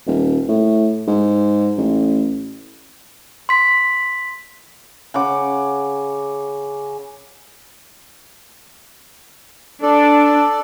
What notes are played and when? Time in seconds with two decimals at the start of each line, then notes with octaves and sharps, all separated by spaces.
0.07 D#1
0.49 A2
1.07 G#2
1.78 A1
3.49 C6 B6
5.14 C#3 F#5 D6
9.82 D4 A4 D5